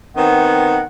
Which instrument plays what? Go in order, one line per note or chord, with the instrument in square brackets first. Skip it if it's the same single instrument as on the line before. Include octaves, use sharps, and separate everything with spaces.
[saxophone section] D#3 B3 C4 [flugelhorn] F#5